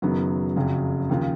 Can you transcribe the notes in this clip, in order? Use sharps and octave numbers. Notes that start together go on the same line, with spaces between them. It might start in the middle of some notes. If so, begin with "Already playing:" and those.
F#1 F#2 D#3 F#3 B3
F#1 F2 C#3 F#3
D#2 C#3 F3